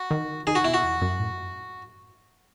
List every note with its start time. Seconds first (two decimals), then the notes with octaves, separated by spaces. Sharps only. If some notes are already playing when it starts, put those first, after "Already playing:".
Already playing: F#4
0.11 D#3
0.47 D#3 G#4
0.55 F#4
0.64 B2 E4
0.74 F#4
0.83 E2
1.02 F#2
1.20 A2